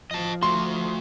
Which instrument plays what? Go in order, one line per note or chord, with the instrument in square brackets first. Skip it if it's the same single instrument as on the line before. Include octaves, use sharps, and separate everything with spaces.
[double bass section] F3 [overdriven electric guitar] D#5 A5
[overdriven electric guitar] A3 F#4 [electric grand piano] C6